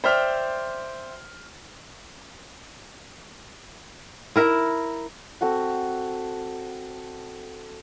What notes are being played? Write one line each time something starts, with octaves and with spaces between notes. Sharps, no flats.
C5 D5 E5 G5 C6 F6
E4 A#4 E5
C4 F#4 A4 F#5